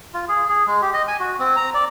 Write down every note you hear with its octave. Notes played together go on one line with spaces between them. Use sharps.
F4
G#4
G#4
G#3
G4
D#5
G#5
F#4
C4
A#5
D5